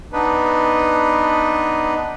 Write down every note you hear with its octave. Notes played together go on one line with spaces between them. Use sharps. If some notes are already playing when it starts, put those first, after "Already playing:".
B3 D4 D#4 B4